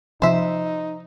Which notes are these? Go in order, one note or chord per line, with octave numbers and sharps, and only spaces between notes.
C3 F3 D#4 C5 E5